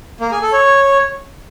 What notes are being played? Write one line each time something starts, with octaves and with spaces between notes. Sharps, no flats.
A#3
G#4
A4
C#5